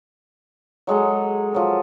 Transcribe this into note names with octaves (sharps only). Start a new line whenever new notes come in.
F#3 G#3 A4 A#5
F3 F#3 A#4